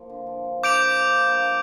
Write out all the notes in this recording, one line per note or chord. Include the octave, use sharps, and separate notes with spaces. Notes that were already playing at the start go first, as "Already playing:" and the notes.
Already playing: F3 A#3
D3
F3
D3
F3 D6 G6 D7 F7
F3
D3
A#3
G3